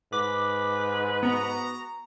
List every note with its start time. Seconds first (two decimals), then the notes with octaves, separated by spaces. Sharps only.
0.13 G#2 B4 D6
1.23 B3 F#4 A#5